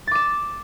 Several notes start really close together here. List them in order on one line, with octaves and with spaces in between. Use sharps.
A6 D6 E7